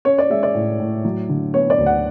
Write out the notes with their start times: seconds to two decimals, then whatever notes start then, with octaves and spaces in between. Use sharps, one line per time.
0.05 C#4 C#5
0.18 D5
0.30 G#3 E5
0.43 D5
0.54 A2
0.79 A2
1.05 F#3
1.29 D3
1.54 B3 C#5
1.70 D5
1.79 D2
1.86 F#5